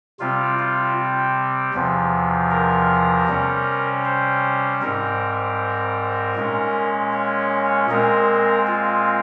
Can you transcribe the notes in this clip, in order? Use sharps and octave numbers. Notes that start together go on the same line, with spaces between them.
C3 G3 C4 F4
F4
E2 C3 F3
A#4
C3 G3 C#4
C5
G#2 G3 C4 A#4
A#2 G#3 C#4
C#5
A#2 G#3 C4 A#4
F4